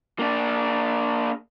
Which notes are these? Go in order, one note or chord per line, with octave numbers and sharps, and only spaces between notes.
A#3 D4